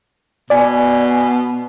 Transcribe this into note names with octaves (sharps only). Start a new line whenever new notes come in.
B2 D5 G#5